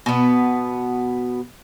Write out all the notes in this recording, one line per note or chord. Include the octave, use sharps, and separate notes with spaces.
B2 B3